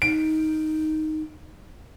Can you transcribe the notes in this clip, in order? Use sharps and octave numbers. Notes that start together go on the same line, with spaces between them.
D#4 D7